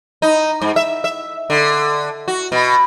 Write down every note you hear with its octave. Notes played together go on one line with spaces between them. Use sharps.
D#4
G#2
E5
E5
D3
F#4
B2